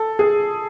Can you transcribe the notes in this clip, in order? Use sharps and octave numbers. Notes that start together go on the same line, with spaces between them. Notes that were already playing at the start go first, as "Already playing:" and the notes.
Already playing: A4
G#4